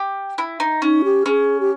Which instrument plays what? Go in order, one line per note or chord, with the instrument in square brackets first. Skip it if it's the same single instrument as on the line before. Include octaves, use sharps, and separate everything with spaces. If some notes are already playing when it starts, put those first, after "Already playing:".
Already playing: [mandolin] G4
E4
D#4
[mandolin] C#4 [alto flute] D#4
[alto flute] G4
[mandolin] C#4 [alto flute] G#4
[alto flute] G4